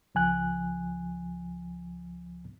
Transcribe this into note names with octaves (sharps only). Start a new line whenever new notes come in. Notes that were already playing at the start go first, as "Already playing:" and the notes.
C#2 F3 G#5 F#6